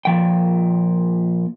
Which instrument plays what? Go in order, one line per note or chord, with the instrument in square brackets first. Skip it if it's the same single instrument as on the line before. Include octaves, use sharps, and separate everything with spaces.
[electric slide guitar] A#2 F3 G5